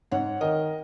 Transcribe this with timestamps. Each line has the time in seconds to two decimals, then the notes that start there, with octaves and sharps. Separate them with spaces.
0.12 G#2 C#5 F#5
0.41 D#3 A#4 D#5